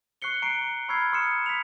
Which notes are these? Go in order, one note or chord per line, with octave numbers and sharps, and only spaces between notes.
C#6 F#6 C7 C#7 G7
A#5 C#6 C7 D7
B5 C#6 E6 F6 G#6 C7
C6 D#6 F6 C#7 E7
B6 F7